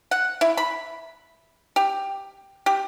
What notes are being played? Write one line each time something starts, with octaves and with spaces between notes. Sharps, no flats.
F#5
E4
B5
G4
G4